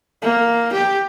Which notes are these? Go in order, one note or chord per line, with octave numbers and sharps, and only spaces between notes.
A#3
G4